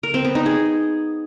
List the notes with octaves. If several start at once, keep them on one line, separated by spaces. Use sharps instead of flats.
A#4
C4
B3
D#4
G#4